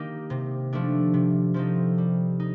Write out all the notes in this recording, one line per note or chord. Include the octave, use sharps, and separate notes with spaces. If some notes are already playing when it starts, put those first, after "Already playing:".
Already playing: D#3 A#3 D#4 G4
C3
F3 A3 D4
C3
F3 A3 C4 D#4
G3
D#4